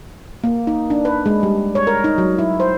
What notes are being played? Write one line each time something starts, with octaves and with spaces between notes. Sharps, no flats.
A#3
D#4
D4
B4
G#3
G3
C#5
A#4
D#4
F#3
E4
C5